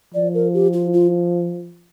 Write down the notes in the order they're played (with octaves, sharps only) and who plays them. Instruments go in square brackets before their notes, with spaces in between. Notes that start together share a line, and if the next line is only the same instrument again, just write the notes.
[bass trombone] F3 [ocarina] D5
[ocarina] A#4
G4
F4
F4